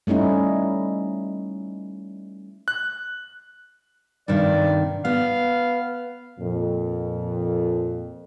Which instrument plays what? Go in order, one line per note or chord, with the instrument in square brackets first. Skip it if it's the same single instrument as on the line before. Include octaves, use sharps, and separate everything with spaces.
[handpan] G3 A3 C#4 D#4 E4
[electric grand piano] F#6
[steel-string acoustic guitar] G2 C3 D#3 [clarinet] D5
[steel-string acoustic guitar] B3 [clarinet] F5
[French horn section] F2 A#2